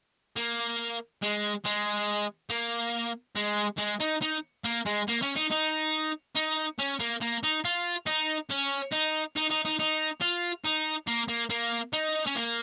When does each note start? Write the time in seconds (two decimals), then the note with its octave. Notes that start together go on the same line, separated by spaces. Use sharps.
0.36 A#3
1.22 G#3
1.65 G#3
2.50 A#3
3.36 G#3
3.78 G#3
4.00 D#4
4.21 D#4
4.65 A#3
4.86 G#3
5.08 A#3
5.22 C#4
5.36 D#4
5.51 D#4
6.35 D#4
6.79 C#4
7.00 A#3
7.21 A#3
7.43 D#4
7.65 F4
8.07 D#4
8.51 C#4
8.92 D#4
9.36 D#4
9.50 D#4
9.65 D#4
9.79 D#4
10.21 F4
10.65 D#4
11.07 A#3
11.29 A#3
11.50 A#3
11.93 D#4
12.26 C#4
12.35 A#3